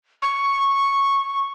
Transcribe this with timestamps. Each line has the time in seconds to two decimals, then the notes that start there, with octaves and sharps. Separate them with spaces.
0.22 C#6